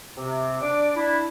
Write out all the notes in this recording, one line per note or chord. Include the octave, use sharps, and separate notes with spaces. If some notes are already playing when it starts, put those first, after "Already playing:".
C3
D4 D5
D4 E4